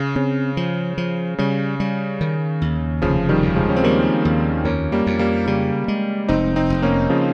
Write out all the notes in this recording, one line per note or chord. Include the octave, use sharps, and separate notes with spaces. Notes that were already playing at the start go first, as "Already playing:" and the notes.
Already playing: C#3
C#3 C4
F3
F3
C#3 G3
G3
D#3
D#2
F1 C#3 F3
D#3 G3
D#2
F3 G#3
C#4
C4
D#3 G3 A#3
D#2
F2 A#3 C#4
G3 A#3
F2
G3 A#3
C#3 G3 A#3
G#3
F1 C4 D#4
C4 D#4
F1
A#3 C#4
C#3 F3